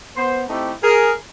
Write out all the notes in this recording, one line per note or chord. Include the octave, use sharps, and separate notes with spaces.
B3 C5
A3 C4 D#4 E4 G4
G#4 A#4